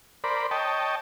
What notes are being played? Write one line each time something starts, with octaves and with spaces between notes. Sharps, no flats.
A#4 C5 D5 B5
C#5 D#5 G5 A5